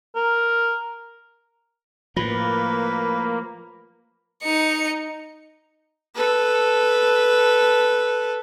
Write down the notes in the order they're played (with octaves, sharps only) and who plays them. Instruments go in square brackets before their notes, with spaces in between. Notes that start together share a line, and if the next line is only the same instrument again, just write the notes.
[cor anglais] A#4
[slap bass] A2 F3 [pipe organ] A#3 [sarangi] B4 [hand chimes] B5 A#6
[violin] D#4 C#7
[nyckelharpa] A4 B4